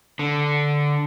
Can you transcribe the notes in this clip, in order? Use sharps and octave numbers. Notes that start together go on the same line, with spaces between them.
D3